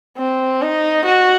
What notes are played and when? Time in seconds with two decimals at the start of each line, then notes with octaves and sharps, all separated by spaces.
0.18 C4
0.62 D#4
1.06 F#4